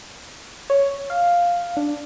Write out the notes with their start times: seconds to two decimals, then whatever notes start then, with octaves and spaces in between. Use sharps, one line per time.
0.70 C#5
1.10 F5
1.77 D4